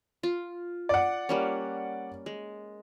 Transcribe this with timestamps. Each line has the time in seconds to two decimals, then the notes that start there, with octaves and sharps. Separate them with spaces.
0.23 F4
0.89 D5 F#5
1.29 G3 A#3 C#4
2.26 G#3